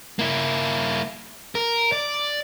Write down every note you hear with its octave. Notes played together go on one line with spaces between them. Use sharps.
A#3 E4
A#4
D5